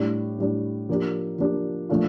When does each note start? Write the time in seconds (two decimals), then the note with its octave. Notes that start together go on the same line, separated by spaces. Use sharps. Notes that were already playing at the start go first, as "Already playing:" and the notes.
Already playing: A2 G3 D4
0.38 A2 G3 D4
0.89 F3 A#3 D4 G4
1.39 F3 A#3 D4 G4
1.89 A#2 F3 A3 D4 F4